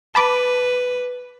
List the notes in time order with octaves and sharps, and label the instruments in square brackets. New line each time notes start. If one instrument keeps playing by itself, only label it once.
[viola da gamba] B4 [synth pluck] A5 B5 D6